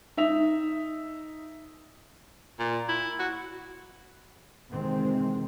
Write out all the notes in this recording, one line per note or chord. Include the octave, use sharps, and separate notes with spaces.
D#4 E5 F7
A#2
E4
F#4
C3 D#3 E3 G#3 C4